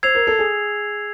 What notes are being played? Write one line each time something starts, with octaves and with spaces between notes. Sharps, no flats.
C5 E6 G#6 C7 F7
A#4
A4
G#4